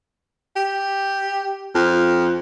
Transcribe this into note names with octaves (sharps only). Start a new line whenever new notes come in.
G4
F2